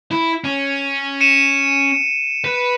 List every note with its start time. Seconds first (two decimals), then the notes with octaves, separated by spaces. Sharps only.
0.11 E4
0.44 C#4
1.21 C#7 D#7 E7
2.44 B4